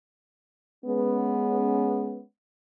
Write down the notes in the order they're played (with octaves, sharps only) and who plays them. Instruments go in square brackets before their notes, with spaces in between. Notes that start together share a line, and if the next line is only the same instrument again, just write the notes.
[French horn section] G#3 B3 C#4